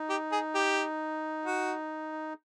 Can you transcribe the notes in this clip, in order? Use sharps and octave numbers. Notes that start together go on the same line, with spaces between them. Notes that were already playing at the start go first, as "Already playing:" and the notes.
Already playing: D#4
G4
G#4
G4
F#4